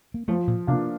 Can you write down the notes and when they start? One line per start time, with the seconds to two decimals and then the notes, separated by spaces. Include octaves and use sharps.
0.14 A#3
0.28 F3 A3
0.48 A#2
0.67 C3 A#3 D4 F4